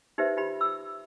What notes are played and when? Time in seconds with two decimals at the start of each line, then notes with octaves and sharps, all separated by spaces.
0.18 D#4 G4 B4 C5 E5
0.37 D#4 F4 G4 B5
0.61 B5 E6